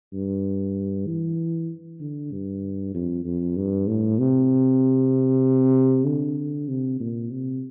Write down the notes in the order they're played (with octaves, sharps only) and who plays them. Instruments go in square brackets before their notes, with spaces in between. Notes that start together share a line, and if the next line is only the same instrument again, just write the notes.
[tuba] G2
E3
D3
G2
F2
F2
G2
A2
C3
D3
C3
A#2
C3